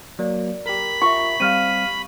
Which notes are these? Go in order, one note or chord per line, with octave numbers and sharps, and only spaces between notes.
F#3 A#3 D5
G4 A#4 B5
F4 E5 C#6
G3 C4 F5 F6 D#7